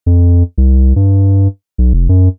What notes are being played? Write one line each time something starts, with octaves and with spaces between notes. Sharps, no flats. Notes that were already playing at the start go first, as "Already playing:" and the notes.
F2
C2
G2
B1
F1
F#2